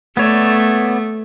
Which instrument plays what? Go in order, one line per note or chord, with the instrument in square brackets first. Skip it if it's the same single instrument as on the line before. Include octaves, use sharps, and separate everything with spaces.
[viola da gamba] A3 [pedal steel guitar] B3 C#5 D5